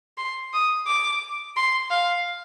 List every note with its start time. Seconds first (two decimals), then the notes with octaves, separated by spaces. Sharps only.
0.18 C6
0.53 D#6
0.87 D6
1.56 C6
1.90 F5